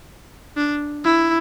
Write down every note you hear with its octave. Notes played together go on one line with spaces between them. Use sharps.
D4
E4